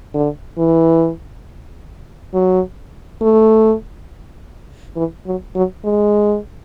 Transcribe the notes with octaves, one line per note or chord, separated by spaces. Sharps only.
D3
E3
F#3
A3
E3
F#3
F#3
G#3